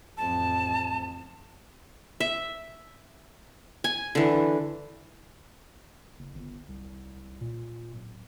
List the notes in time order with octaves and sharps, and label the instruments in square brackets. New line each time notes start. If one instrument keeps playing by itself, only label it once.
[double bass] A1 F2 [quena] A5
[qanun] E5
G#5
D3 E3
[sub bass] F#1
G1
C2
A#2
D1